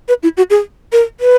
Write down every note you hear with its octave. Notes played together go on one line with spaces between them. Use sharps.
B4
E4
F#4
G#4
A#4
B4